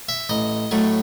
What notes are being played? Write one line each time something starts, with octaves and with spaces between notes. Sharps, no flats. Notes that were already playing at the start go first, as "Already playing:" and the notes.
E5
A1 D#5
A2 F#3 A3